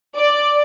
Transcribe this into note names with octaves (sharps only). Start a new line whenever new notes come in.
D5